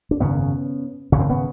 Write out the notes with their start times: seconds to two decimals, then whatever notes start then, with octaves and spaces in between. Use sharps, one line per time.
0.11 D4
0.20 G#1 F#2 C#3 B3 C#4
1.12 G#1 F#2 C#3 C#4
1.20 C4
1.30 B3 C#4